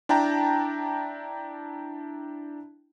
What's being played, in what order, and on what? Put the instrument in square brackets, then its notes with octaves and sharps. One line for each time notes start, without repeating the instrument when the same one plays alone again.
[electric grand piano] D4 E4 G5 A5 A#5